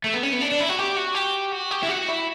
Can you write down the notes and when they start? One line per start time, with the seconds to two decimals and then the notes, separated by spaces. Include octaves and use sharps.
0.04 A3
0.14 B3
0.23 C#4
0.33 B3
0.41 D4
0.51 D4
0.60 E4
0.69 F#4
0.79 G4
0.97 F#4
1.15 G4
1.53 F#4
1.71 G4
1.83 E4
1.89 F#4
2.08 E4